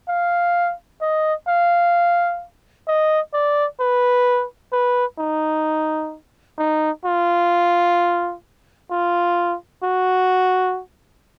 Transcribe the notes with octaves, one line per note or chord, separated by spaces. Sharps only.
F5
D#5
F5
D#5
D5
B4
B4
D#4
D#4
F4
F4
F#4